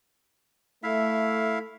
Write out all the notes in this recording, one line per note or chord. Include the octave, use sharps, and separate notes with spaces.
A3 E4 E5 F5